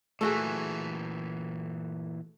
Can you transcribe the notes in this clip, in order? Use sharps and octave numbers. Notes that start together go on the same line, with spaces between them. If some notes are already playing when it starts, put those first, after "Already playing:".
A#2 E3 A3 F#4 G#4